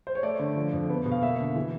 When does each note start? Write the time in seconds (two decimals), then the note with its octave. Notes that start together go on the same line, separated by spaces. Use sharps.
0.07 C5
0.15 C#5
0.23 A3 D5
0.39 D3
0.56 F3
0.73 F2
0.90 B3
1.06 B2
1.11 F5
1.22 A#3 E5
1.40 D3
1.56 E3